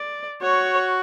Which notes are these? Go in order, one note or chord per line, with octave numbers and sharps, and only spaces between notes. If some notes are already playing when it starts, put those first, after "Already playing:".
Already playing: D5
F#4 C#5